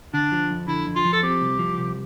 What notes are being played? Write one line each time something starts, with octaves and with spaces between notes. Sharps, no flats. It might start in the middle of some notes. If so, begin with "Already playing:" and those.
D3 D4
F3
F2
D3 E4
F2
F4
F3
A4
C4 G4
C2
F3
C2